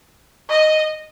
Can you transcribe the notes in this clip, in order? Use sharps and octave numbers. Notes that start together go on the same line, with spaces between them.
D#5